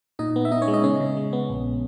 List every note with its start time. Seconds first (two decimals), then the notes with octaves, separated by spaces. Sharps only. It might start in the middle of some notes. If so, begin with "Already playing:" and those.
0.19 A#2 D#4 D#5
0.36 B3
0.45 E5
0.51 B3 D#4 D#5
0.62 C#4 C#5
0.68 G#3
0.74 D#4 D#5
0.84 C#3 C#4 C#5
1.00 C#3
1.17 G#3
1.33 B3
1.49 A#1